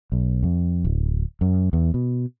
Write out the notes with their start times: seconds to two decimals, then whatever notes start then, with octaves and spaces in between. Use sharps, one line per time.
0.12 B1
0.43 F2
0.85 D1
1.41 F#2
1.73 E2
1.94 B2